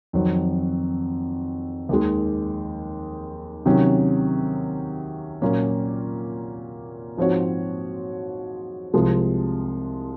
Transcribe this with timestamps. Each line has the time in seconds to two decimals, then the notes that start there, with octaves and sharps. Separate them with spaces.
0.13 F2 D#3 F#3 C4
1.89 D#2 D#3 G#3
3.66 C3 D#3 F#3 C#4
5.42 A#2 F#3 A#3 C#4
7.17 G#2 F3 C4 F#4 C#5
8.94 C2 C3 F3 G#3